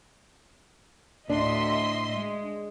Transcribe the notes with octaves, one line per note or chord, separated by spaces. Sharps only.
D2 A2 D4 D#5 E5 C6
G#3